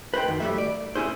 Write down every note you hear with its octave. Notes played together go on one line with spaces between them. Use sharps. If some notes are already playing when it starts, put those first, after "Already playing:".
B4 C5 E5 G5
F#2 D#3
F#3 G3 A3 E5
D5
C#4 E4 G#4 C5